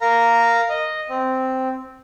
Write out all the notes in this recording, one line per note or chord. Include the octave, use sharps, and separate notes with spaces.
A#4 F5 A#5
D#5
C4